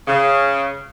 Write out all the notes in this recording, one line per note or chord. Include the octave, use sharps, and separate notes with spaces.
C#3